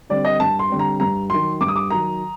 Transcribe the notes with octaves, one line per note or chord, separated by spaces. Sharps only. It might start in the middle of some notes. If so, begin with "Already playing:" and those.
D3 G3 C4 D5
D#5
G2 A5
C6
D3 G3 C4
A#5
G2 A#5
D#3 F#3 C6
G2 D6
D#6
D6
D#3 F#3 A#5